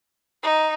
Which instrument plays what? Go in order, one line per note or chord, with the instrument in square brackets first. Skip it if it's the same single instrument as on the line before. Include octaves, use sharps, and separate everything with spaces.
[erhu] D#4